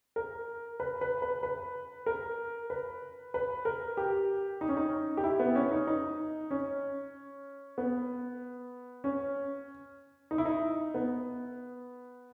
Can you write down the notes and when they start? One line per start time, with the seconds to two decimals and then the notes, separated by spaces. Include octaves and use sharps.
0.16 A#4
0.80 B4
1.01 B4
1.22 B4
1.43 B4
2.06 A#4
2.70 B4
3.34 B4
3.65 A#4
3.97 G4
4.61 D#4
4.69 C#4
4.77 D#4
5.17 G4
5.24 E4
5.40 B3
5.55 C#4
5.72 D#4
5.87 D#4
6.51 C#4
7.78 B3
9.04 C#4
10.31 D#4
10.38 E4
10.45 D#4
10.94 B3